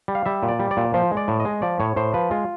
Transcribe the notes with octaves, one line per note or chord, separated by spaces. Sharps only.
G3
F5
G3 E5
A#2
D5
G3
D5
A#2
F3 C5
G#3
D5
A2
D#5
G#3
F3 D5
A2 C#5
A2 C5
F3 B4
G#3 F4